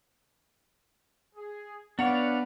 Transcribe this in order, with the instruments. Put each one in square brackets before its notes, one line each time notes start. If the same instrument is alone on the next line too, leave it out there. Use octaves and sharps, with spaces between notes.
[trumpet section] G#4
[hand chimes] B3 [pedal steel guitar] D4 C#5 F5 [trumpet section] B4 D5 [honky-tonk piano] F#5